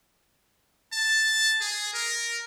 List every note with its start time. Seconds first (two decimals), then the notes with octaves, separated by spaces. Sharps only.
0.93 A5
1.61 G#4
1.94 A#4